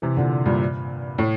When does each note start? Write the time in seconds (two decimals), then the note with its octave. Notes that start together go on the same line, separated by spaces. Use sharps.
0.02 C3 E3
0.17 A#2 D3
0.46 G2 A#2
1.18 A2